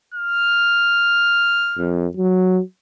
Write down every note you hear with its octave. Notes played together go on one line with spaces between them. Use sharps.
F6
F2
F#3